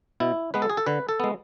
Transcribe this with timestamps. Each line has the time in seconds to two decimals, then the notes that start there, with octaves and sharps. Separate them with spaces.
0.20 B2 E4
0.54 G#3 B3 B4
0.62 A4
0.70 G#4
0.77 A4
0.86 D3 B4
1.09 A4
1.20 G#3 B3